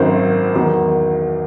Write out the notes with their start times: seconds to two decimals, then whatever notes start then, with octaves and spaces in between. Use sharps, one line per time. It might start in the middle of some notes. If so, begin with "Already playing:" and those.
Already playing: G#1 F#2 D#3 F#3 C5
0.55 E2 D#3 F#3